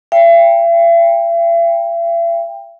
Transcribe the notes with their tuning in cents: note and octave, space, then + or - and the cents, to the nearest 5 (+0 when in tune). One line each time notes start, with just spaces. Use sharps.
E5 +45 G5 +20